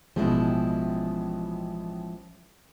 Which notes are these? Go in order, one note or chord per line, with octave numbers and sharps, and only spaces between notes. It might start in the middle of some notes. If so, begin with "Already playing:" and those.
A1 B2 F3 G#3 E4